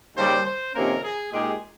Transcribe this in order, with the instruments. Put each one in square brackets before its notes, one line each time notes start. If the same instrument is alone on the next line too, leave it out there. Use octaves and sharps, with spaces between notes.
[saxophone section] D#2 C#3 G3 [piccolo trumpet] C5
[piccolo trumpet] C5
[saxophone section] F2 C3 D#3 A#3 C#4 [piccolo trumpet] A#4
[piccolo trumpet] G#4
[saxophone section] A#2 G#3 D#4 G4 [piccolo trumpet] G#4